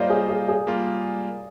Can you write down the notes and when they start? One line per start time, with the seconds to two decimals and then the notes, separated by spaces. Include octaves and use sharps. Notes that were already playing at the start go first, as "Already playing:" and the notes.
Already playing: G3 A#3 F4 C5 D5 D#5 F5
0.10 G#4
0.29 G#4
0.48 G#4
0.67 G3 A#3 F4